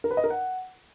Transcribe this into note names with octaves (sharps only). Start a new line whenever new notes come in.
A#4
B4
D#5
A#4
F#5